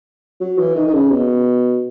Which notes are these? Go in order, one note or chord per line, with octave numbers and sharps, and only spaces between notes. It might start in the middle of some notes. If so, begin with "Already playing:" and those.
F#3
E3
D#3
D#3
C#3
B2